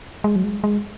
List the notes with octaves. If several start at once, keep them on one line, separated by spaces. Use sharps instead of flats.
G#3
F#3
G#3
G#3